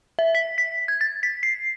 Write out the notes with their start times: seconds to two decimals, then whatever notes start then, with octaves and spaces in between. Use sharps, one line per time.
0.19 E5
0.35 B6
0.58 B6
0.88 G#6
1.01 A6
1.23 B6
1.43 C7